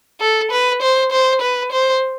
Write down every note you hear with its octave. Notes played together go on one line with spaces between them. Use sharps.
A4
B4
C5
C5
B4
C5